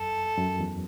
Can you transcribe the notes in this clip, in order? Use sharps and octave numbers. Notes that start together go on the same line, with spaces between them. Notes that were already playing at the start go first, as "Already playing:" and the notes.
Already playing: F#2 A4
F#2
E2